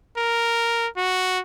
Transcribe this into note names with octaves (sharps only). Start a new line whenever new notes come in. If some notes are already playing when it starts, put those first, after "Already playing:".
A#4
F#4